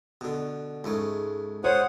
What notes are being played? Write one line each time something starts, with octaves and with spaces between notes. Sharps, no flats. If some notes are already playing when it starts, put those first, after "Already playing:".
B2 D3
C#2 G#2 A3
C5 C#5 F#5 D#6